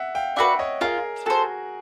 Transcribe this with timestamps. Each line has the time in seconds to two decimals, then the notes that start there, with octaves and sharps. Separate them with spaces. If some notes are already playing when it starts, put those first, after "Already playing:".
Already playing: E5 F#5
0.15 F5 G5
0.36 D4 F#4 B4 E5 F#5
0.59 C#5 D#5
0.81 F4 G#4 A#4
1.26 F#4 G#4 A4 C5